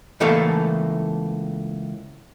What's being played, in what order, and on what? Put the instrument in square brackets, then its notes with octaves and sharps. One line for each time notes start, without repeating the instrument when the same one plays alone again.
[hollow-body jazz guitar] C#2 E3 A3 A#3 A4 F5